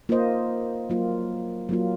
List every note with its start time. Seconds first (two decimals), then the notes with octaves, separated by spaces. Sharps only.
0.09 A#3 F4 C5 D#5
0.90 F#3 A#3 F4
1.69 F#3 A#3 F4